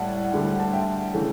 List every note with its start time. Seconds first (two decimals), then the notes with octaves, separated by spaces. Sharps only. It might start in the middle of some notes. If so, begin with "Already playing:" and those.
Already playing: A2 G3 D5 F#5 A5
0.32 D2 D3 G3
0.60 A5
0.73 E5 G5
1.14 C#3 E3 A3